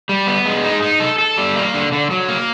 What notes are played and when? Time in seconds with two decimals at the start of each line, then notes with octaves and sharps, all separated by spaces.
0.09 G3
0.27 B3
0.46 G#3
0.64 D#4
0.82 D#4
1.00 A4
1.18 A4
1.38 G3
1.56 A#3
1.74 D3
1.92 D3
2.11 F#3
2.29 A#3